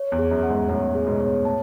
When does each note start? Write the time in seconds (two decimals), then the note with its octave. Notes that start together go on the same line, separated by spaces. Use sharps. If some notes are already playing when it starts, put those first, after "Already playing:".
Already playing: C#5
0.12 E2
0.19 G#4
0.31 F#2
0.43 F#5
0.50 E2 G#2
0.68 F#2 A2 C#5
0.95 G#4
1.06 G#2 B2
1.20 C#5
1.45 A2 A5